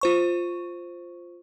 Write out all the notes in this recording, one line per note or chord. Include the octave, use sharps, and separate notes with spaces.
F4 C5 C#6